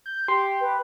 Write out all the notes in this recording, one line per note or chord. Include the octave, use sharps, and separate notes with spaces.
G6
G4 C6
B4